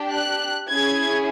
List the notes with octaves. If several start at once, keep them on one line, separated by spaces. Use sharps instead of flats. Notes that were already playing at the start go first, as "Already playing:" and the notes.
Already playing: D4 G4
F#6
C#4 E4 G#4 G#6